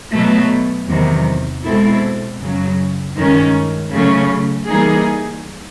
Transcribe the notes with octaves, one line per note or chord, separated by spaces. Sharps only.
B2 F#3 A3
E2 C3 D#3 F#3
B2 G#3 C4 E4 A4
F#2 C#3 F#3
G2 D#3 G#3 C#4
C#3 F#3 A3 C#4
E3 G3 A#3 D#4 G#4